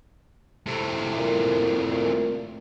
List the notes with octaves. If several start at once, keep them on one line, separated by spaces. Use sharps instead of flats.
A2 C3
A#2
A#2